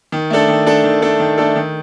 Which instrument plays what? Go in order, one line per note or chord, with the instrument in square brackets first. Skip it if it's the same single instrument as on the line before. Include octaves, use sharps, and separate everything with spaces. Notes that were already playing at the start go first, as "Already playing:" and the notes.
[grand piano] D#3
A3 D4 A4
D#3
A3 D4 A4
D#3
A3 D4 A4
D#3
A3 D4 A4
D#3